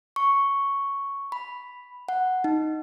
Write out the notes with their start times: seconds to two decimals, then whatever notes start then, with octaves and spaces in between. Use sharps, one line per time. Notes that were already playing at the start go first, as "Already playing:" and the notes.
0.16 C#6
1.32 B5
2.09 F#5
2.44 D#4